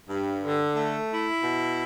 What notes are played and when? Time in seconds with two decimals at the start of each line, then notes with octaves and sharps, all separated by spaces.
0.09 G2
0.43 D3
0.76 A3
1.09 E4
1.43 B2